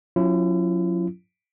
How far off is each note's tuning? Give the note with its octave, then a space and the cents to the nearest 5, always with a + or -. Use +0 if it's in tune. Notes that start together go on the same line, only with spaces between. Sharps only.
F#3 -40 C#4 +0 E4 +40